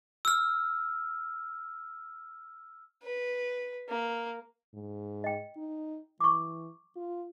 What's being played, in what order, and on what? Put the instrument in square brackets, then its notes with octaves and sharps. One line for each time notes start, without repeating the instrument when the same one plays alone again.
[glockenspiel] E6 F6
[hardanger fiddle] B4
A#3
[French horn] G#2
[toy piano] D#5 G5
[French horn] D#4
[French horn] E3 [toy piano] C#6 D6
[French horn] F4